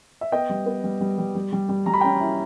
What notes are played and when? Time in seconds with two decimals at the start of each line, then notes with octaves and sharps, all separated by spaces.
0.21 E5
0.32 B3 D#5 G5
0.49 G3
0.66 B3
0.84 G3
1.01 G3
1.18 G3
1.35 G3
1.53 G3
1.69 G3
1.86 G3 A#5
1.93 B5
2.00 C#4 G5 A#5
2.21 E4